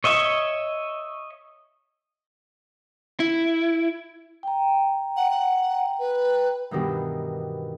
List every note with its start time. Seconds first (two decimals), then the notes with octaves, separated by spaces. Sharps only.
0.04 C#5 D#5 E5 C#6
3.20 E4
4.43 G5 A#5
5.17 F#5
5.31 F#5
5.99 B4
6.71 G2 B2 D#3 E3